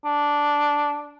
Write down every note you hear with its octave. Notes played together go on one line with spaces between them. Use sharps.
D4